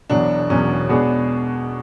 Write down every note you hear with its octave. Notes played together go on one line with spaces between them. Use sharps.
E1 E2 B2 F#3 D4
E1 E2 B2 F#3 C#4
B2 G#3 B3 D4 G#4